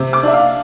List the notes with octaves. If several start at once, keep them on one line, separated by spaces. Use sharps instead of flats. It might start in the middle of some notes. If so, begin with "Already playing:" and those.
Already playing: C3
D6
D4 E5
F5